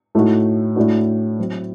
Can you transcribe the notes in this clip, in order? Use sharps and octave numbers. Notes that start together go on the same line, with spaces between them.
A2 A3 D#4 F#4
A2 A3 D4 F#4
F#3 C4 F#4